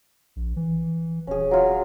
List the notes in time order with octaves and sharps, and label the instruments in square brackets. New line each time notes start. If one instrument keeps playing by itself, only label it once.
[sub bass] A#1
E3
[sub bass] D#1 [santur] C#4 G#4
[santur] F#3 F4